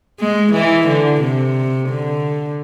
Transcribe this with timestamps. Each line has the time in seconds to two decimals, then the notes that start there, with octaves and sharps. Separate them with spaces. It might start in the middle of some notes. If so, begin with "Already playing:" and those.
0.20 G#3
0.53 E3
0.88 D3
1.21 C3
1.89 D3